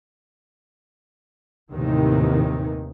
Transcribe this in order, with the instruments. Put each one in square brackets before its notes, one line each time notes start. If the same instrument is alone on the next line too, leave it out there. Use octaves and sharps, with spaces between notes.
[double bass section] D#2 A2 C3 D#3 E3